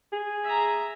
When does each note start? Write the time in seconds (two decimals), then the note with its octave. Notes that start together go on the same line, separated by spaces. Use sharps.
0.13 G#4
0.44 E5 A#5